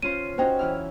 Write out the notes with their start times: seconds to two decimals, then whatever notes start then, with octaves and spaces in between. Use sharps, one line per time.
0.02 C#4 F4 C5 D#7
0.38 C#4 D#4 F#4 C5 G5
0.59 E3 E4 F6